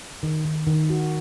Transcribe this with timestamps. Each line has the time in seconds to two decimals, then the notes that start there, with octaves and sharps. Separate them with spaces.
0.23 D#3
0.45 D#3
0.67 D#3
0.90 F#4